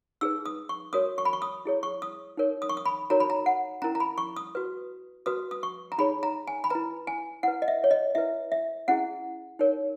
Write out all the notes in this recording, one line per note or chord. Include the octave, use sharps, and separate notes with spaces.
D#4 G#4 B4 E6
D#6
C#6
F#4 A#4 C#5 D#6
C#6
B5
C#6
D#6
E4 G#4 C#5
C#6
D#6
D#4 A#4 C#5
D#6
C#6
D#6
B5
D#4 F#4 A#4 C#5 A#5
B5
A#5
F#5
C#4 E4 A#4 A#5
A#5
B5
C#6
D#6
F#4 B4
F#4 B4 D#6
D#6
C#6
A#5
D#4 G#4 C#5 B5
A#5
G#5
B5
E4 B4 A#5
G#5
E4 B4 F#5
D#5
E5
C#5
D#5
E4 B4 E5
E5
C#4 E4 G#4 F#5
D#4 A#4 C#5